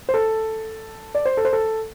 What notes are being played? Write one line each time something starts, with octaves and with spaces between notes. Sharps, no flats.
C5
A4
D5
C5
A4
C5
A4